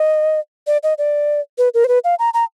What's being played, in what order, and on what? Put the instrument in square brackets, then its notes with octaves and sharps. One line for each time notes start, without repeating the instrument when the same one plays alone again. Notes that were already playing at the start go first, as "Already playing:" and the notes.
Already playing: [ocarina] D#5
D5
D#5
D5
B4
A#4
C5
B4
F5
A#5
A#5